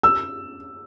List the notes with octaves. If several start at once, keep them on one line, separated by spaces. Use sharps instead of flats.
E6